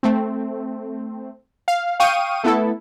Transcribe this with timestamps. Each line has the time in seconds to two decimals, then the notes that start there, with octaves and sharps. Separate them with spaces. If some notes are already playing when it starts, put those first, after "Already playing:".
0.03 A3 C4
1.68 F5
2.00 F5 G5 C#6 D#6 D#7
2.44 A3 B3 E4 A4